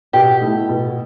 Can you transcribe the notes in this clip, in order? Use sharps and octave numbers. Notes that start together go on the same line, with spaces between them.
B2 G4
A3 E4
B2